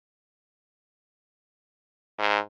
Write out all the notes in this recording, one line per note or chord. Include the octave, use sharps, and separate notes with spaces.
G#2